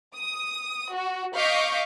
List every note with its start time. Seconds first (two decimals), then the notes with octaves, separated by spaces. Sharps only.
0.16 D#6
0.93 F#4
1.35 D#5 F5 C#6 D6 G6 B6